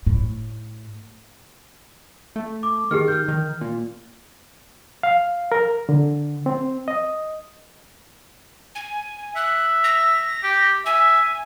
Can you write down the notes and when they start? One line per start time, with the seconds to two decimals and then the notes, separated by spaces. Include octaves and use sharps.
0.06 A2
2.36 A3
2.63 D6
2.91 D#3 G4 G#4 F6
3.08 F6 G6
3.28 D#3
3.61 A#2
5.03 F5
5.52 A#4
5.89 D3
6.46 C4
6.88 D#5
8.75 G#5
9.36 E5 F#6
9.84 A#6
10.43 G4
10.86 E5 G#5